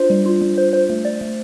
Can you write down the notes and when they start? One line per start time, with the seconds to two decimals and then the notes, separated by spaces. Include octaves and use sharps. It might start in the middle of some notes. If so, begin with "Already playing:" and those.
Already playing: D4 F4 C5
0.10 G3
0.26 F4
0.42 G3
0.58 C5
0.73 C5
0.90 A3
1.05 D5
1.21 A3